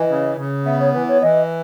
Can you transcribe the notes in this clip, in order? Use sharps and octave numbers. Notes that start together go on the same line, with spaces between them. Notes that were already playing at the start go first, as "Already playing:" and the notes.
Already playing: E3 D#5
C#3
C#3
B3 E5
C#5
E3 B4
C#5
E3 D#5